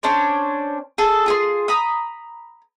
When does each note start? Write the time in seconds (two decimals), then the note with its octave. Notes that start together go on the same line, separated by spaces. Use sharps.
0.03 C#4 D4 C5 C#5
0.98 G#4 A4
1.26 F4 G#4 C6
1.68 A#5 B5 D#6